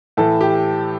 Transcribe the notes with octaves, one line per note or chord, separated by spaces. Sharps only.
A2 E3 A4
G4